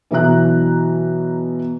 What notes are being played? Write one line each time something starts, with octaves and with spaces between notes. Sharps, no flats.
B2 E3 F#3 E4 A#5 F#6